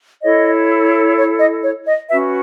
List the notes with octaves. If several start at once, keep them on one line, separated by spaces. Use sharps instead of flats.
E4 A4 C#5 D#5
C#5
D#5
C#5
D#5
C#4 F#4 B4 E5